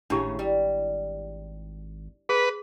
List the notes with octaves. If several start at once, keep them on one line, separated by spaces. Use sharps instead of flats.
G#1 A2 C#3 D4 E4 G4
G3
G#4 B4